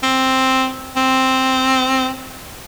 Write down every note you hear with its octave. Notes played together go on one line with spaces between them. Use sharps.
C4
C4